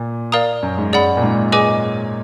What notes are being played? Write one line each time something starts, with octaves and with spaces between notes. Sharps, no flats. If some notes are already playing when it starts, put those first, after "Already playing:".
Already playing: A#2
A#4 D5 F5 A#5 D#6
F#2
G#2
F#2 G#4 D5 F#5 B5
A#2
G#2
G#4 B4 D#5 G#5 D6